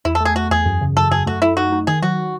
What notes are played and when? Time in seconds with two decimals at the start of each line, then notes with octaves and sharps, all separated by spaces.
0.05 E2 E4
0.15 A4
0.20 A3
0.25 G#4
0.36 A3 F#4
0.51 E2 G#4
0.66 F#2
0.81 C#3
0.97 F#2 A4
1.11 F#2 G#4
1.26 A3 F#4
1.42 A3 E4
1.57 D#4 F#4
1.72 D#4
1.87 D#3 G#4
2.02 F#3 F#4